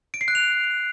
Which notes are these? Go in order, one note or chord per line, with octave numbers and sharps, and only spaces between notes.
D7
C7
F#6
F7